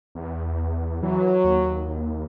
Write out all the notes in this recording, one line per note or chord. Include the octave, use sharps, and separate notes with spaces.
E2
E3 F#3
D#2